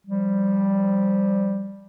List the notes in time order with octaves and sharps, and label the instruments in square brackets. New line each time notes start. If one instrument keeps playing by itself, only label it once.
[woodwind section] F3 G3